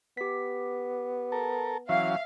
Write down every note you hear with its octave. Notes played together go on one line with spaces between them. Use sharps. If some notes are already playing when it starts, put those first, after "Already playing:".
B3 G4 B6
A4 A#4
E3 F#3 C#4 E5 F5